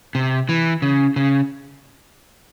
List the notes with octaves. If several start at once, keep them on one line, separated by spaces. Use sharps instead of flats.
C3
E3
C#3
C#3